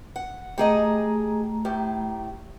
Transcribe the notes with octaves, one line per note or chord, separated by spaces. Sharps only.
F#5
A3 G4 G#4 D#5 A#5
A2 G4